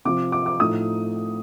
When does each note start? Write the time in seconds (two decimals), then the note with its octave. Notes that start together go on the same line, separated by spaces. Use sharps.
0.05 C3 F3 C4 D6
0.32 D6
0.46 D6
0.60 A2 F3 A3 D#4 D#6